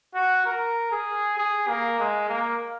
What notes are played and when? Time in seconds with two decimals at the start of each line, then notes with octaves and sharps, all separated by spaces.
0.15 F#4
0.45 A#4
0.91 G#4
1.38 G#4
1.68 A#3
1.99 G#3
2.29 A#3